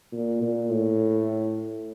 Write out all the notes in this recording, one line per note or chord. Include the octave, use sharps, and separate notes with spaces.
A#2
A#2
A2